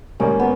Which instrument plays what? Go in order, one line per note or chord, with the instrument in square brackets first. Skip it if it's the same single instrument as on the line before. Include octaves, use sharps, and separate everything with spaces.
[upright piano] G#2 D#3 G3 A#3 D#4 [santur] C#4
[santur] B3